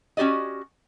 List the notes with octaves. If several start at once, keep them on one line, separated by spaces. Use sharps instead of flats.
C#4 F#4 G4 D5 D#5